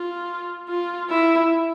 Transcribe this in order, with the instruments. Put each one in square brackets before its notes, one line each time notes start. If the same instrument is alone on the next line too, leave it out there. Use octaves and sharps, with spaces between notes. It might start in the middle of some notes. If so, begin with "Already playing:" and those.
Already playing: [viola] F4
F4
E4